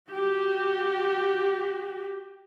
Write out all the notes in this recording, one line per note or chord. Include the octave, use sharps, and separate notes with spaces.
F#4 G4